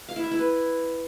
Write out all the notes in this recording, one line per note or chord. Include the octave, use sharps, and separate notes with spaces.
F5
E4
E5
E4
B4